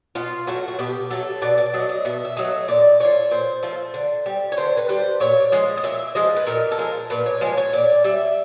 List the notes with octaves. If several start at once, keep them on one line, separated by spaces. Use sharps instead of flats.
B2 F4
F#3 A3 F#4
F#4
B2 G4
F#3 A3 A4
B2 D5
D5
F#3 A3 D#5
D#5
B2 E5
E5
F#3 A3 D#5
A#2 D5
F3 A3 C#5
A#2 C5
F3 A3
D3
G3
C#5
D3 C5
B4
G3 C5
A#2 C#5
F3 G#3 D#5
D#5
A#2 E5
F3 G#3 D#5
B4
A#2 A#4
A4
F3 G#3 A#4
A#2 B4
C#5
F3 G#3
C#5
A#2 D5
G3 E5